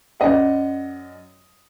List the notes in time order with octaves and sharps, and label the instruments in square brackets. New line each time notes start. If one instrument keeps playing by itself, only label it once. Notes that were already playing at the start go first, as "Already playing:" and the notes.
[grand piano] F#2 D5 D#5 F#5